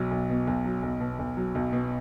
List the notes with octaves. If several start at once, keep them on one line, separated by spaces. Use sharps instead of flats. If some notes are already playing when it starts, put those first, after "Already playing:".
Already playing: B1 F#3
B1
B2
B1
F#3
B1
B2
B1
F#3
B1
B2